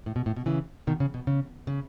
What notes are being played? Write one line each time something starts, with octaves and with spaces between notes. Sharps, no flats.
A2
B2
A2
B2
C#3 E3
B2 D#3
C#3
B2
C#3
C#3